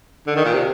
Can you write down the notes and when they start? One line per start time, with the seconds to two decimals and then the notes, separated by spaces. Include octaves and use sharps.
0.27 D3
0.36 D#3
0.45 A#2
0.54 C3